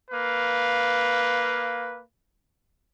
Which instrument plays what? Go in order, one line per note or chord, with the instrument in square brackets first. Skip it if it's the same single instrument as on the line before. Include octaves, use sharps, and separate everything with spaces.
[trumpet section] A#3 B4 F5